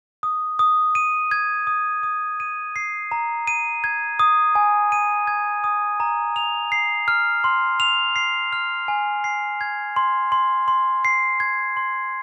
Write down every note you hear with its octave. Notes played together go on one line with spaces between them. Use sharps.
D#6
D#6
D#7
G#6
D#6
D#6
D#7
C7
A#5
D#7
G#6
D#6
G#5
D#7
G#6
D#6
A#5
F7
C7
F6
C6
F7
C7
F6
G#5
C7
G#6
C6
C6
C6
C7
G#6
C6